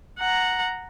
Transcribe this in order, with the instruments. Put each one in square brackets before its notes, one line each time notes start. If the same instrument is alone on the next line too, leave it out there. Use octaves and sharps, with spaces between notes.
[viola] F#5 A#5